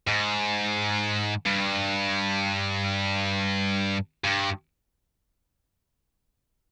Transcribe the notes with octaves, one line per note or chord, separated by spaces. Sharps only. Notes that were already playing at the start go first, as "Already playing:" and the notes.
G#2
G2
G2